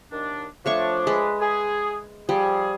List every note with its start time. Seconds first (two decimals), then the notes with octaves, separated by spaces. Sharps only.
0.12 D#2 D#3 D4
0.66 F3 A3 D4 C#5 C#6
1.07 G#3 B4
1.40 G#4
2.29 F3 G3 G#4